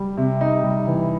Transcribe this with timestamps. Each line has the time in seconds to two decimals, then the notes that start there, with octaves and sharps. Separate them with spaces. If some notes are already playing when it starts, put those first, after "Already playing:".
Already playing: G3
0.17 C3
0.41 D#4
0.64 G3
0.87 E3